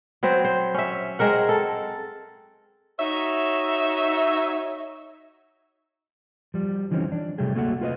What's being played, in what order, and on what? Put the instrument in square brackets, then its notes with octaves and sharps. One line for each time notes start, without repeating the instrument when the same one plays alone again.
[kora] F#3 B3 C4 C5
C5
C#4 E5
G#3 C4 A#4 F#5
A4
[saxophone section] D#4 F#4 C#5 E5
[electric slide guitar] F3 G3
D3 E3 F3 C4 C#4 D#4
D4
C3 F#3 G3 A3 G4 G#4
A3 A#3 F#4 A4 F#5
F4 B4 D5 D#5 F5